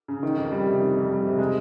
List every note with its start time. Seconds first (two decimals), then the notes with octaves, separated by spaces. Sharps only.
0.08 C#3
0.23 D#3
0.37 F2
0.52 G3
0.66 C3
0.81 D#3
0.96 F2
1.10 G3
1.25 C3
1.39 G#3